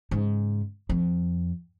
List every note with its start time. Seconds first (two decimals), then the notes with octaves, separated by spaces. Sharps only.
0.11 G#2 C#3
0.89 F2